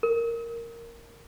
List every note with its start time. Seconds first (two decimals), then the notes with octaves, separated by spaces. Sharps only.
0.03 A#4